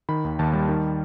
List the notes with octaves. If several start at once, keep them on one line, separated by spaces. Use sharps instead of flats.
D#3 B5
D#2
D#2 A5
G3
D#3